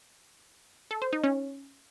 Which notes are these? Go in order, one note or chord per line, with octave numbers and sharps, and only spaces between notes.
A4
C5
D#4
C#4